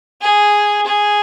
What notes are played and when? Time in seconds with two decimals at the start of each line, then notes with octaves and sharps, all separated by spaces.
0.22 G#4
0.87 G#4